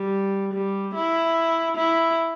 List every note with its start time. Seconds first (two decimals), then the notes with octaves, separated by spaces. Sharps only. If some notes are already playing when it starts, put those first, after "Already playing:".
Already playing: G3
0.53 G3
0.94 E4
1.77 E4